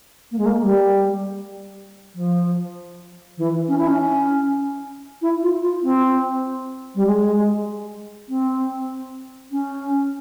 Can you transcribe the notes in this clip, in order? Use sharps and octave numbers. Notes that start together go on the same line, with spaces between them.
A#3
G#3
A#3
G3
F3
E3
C#4
E4
C#4
E4
F4
F4
C4
G3
G#3
C4
C#4